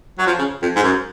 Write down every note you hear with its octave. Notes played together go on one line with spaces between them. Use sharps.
F#3
F3
C#3
F2
G#2
F#2